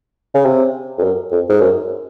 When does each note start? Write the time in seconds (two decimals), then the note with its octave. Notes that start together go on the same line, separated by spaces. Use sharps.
0.34 C#3
0.46 C3
0.98 F2
1.03 F#2
1.32 F2
1.49 G#2
1.61 F#2